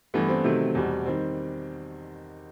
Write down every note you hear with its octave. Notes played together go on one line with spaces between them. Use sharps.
G2 E3 A3 B3
C4
C3 D#3 F#3 A3
E2 B2 G3
D#3 G3 C4